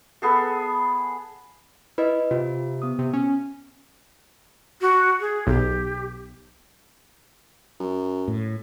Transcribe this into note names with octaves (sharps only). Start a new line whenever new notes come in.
B3 G#4 A4
E4 B4 D#5
C3 F4
B3 D#6
C3
C#4
F#4
G#4
B1 G4
F#2
A2